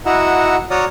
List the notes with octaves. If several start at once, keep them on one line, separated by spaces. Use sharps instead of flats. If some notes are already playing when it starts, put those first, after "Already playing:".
E4 F#4 D#5 F#5 A#5 E6
F#4 C#5 D5 A#5 D#6 F6